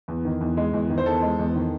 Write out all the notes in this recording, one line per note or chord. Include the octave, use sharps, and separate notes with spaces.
E2
D#3
E2
G#3
E2
D#3
C5
E2 A4
G#3
E2
D#3